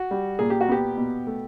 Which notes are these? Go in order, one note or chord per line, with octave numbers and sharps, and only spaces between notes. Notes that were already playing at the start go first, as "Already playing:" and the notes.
Already playing: F#4
G3
A#2 G#4
G4
F#4
B3 G4
B2
A3